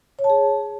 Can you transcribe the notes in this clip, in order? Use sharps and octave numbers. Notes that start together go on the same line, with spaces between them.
C#5
A5
G#4